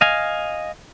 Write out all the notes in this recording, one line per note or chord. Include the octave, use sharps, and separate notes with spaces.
D#5 F5 G#5